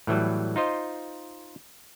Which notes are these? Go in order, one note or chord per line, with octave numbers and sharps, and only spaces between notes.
A2 E3 F#3 G3
D#4 F4 C5 D#5